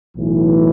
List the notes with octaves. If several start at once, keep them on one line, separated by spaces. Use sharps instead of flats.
B1 A2 E3